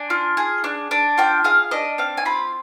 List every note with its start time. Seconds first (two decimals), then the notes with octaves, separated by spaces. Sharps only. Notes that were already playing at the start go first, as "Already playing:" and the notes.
Already playing: D4 G#5
0.10 F4
0.37 G#4
0.64 D4
0.91 D4
1.18 F4 G5
1.44 G#4 F5
1.71 D4 D#5
1.98 C4 F5
2.17 G#5
2.25 F4 B5